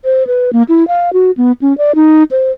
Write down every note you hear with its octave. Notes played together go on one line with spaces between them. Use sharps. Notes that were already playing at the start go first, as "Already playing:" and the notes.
C5
B4
A#3
E4
F5
F#4
B3
C#4
D5
D#4
C5